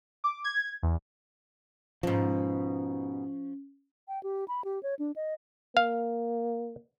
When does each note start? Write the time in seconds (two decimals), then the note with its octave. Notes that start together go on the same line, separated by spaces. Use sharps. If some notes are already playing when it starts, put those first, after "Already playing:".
0.24 D6
0.44 G#6
0.83 E2
2.03 G#2 B2 F3 C#4
4.08 G5
4.23 G4
4.48 B5
4.64 G4
4.83 C#5
4.99 D4
5.16 D#5
5.77 A#3 F5